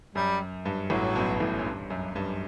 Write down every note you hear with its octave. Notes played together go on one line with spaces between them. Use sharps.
F#2 G3
G2
A1 A2 F#3
B1 B2
A1 A2
F#2
G2
F#2
G2